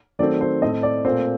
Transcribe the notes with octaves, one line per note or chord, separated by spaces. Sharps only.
D#3 F#3 A3 C4 D5
C5
A2 A3 C4 D#5
D5
A#2 A3 C4 C5